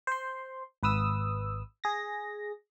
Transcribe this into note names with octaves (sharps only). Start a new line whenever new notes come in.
C5 C6
G#1 B4 D#6 E6
G#4 A#6